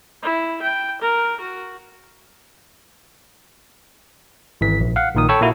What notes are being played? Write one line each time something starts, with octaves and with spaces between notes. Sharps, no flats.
E4
G5
A#4
F#4
G#1 E3 B6
A#1
F5 F#5
A#1 A#2 D#3 A#4 D#6
A4 C#5 G5 B5 C#6 E6
A#2 A#3 E4 F#4